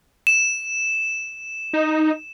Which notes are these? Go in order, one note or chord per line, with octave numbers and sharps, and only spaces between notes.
E7
D#4